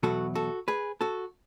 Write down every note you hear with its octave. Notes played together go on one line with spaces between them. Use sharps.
E2 B2 F#3 F#4 A4
F#4 A4
G#4 B4
F#4 A4